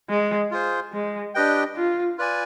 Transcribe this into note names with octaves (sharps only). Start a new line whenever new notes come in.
G#3
F4 G#4 C5
G#3
D4 G4 B4 D#5 G5
F4
F4 B4 D5 G#5